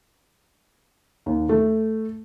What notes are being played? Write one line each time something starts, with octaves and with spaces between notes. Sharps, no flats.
D#2
A3